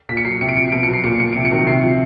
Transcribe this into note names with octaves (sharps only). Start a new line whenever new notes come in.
A#2 B6
C#7
F#3 C7
C3 C#7
D7
F3 C#7
B2 D7
F#3 C#7
C7
A#2 C#7
F3 C#7
C3 D7
C#7
D#3 F#3
C3 C7
F3